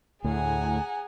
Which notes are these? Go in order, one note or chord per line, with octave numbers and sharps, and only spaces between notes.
D2 A2 G#4 F#5 G#5 A#5